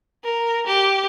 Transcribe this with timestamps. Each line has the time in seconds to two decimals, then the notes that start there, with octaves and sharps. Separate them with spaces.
0.24 A#4
0.67 G4